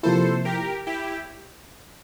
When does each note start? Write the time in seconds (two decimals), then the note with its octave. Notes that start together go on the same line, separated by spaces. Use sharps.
0.03 C3 F3 A#3 E4 A4 C5
0.45 G4 A#4
0.87 E4 G4